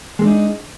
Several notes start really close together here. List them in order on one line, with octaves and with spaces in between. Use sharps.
G#3 C4 D4 D#4